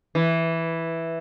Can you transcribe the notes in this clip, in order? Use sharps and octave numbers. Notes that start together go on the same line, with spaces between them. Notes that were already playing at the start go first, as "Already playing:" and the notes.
E3